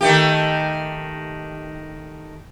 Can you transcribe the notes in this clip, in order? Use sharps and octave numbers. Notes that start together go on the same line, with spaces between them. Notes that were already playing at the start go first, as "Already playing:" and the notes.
D#3 A3 G4